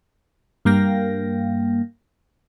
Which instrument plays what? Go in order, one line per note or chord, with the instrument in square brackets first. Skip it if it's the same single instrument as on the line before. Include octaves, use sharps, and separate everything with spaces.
[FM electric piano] G2 A#3 F5 G5 A#6